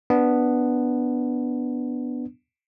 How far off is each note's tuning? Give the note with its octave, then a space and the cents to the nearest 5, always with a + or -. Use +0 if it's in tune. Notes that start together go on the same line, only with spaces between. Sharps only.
B3 +0 D4 +0